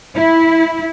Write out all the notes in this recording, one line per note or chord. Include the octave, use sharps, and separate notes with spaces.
E4